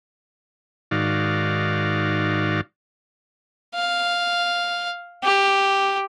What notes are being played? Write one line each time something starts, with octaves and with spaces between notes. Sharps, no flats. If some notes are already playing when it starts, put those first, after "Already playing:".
G#2 D#3 F#4 D5 F5
F5
G4